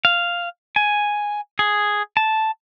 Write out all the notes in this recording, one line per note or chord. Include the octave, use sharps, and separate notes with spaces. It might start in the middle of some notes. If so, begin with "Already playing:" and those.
F5
G#5
G#4
A5